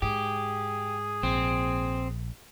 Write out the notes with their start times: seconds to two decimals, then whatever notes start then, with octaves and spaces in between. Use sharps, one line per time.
0.02 G#2 G4 G#4
1.23 A#1 C4